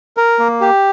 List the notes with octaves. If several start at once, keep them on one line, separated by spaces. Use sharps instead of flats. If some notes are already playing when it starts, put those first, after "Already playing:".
A#4
A#3
G4